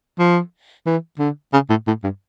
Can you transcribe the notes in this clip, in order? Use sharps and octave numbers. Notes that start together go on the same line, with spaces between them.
F3
E3
D3
C#3
A2
A2
G2